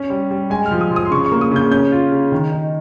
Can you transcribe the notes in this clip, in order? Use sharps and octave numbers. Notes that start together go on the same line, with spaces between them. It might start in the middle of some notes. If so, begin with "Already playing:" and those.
Already playing: C#4
G3
G3
G#3 G#5
F6
F3
D#6
F3
D#6
C6
C#3 C#6
C#6
A#3
D#6
C#3 G6
C#4 G6
F4
C#3
D#3
D#4